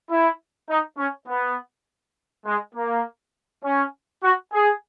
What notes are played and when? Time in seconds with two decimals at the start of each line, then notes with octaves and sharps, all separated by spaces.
0.10 E4
0.69 D#4
0.98 C#4
1.28 B3
2.46 G#3
2.75 A#3
3.64 C#4
4.23 F#4
4.52 G#4